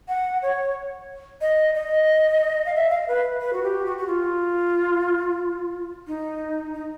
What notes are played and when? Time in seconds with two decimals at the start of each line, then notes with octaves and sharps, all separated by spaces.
0.08 F#5
0.42 C#5
1.41 D#5
1.75 D#5
2.66 F5
2.75 E5
2.91 F5
3.08 B4
3.41 B4
3.53 F#4
3.64 G4
3.86 F#4
3.98 F#4
4.07 F4
6.07 D#4
6.73 D#4